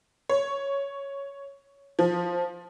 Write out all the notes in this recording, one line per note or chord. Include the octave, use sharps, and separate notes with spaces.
C#5
F3